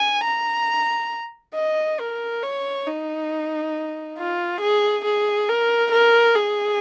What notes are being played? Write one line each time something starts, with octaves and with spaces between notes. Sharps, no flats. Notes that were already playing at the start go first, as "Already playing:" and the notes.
Already playing: G#5
A#5
D#5
A#4
C#5
D#4
F4
G#4
G#4
A#4
A#4
G#4